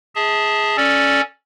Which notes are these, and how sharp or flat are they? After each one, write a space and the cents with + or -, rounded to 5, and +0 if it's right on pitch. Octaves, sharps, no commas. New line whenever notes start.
G#4 +0 E5 -40 A5 +0
C#4 +0 A4 -5 D5 +0